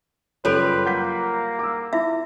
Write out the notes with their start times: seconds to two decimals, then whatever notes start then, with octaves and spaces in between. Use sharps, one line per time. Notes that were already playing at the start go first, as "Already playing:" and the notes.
0.45 F#1 G3 F4 A4 B4 C#5 D7
0.86 A#3 F#5 G6 B6
1.59 D6 E6
1.93 E4 F4 E5